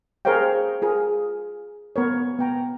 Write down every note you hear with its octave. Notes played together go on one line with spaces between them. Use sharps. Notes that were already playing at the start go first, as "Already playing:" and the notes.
G#4 A#4 C5 C#5 F5 G5
F4 G#4 A#4
B3 A#4 C#5
B3 G5 A#5